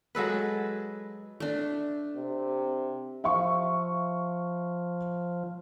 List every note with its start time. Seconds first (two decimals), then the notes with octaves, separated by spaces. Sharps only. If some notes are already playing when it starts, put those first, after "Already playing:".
0.15 F#3 G#3 A4 B4
1.40 A3 D4
2.17 C3
3.24 F3 E5 F5 C#6